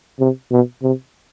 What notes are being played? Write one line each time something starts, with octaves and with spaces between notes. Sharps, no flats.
C3
B2
C3